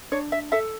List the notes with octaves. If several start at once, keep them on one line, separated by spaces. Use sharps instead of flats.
D4 C#5
E5
A4 E5